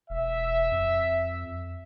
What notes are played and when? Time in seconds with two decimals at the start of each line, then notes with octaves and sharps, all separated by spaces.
0.10 E1 E5
0.72 F2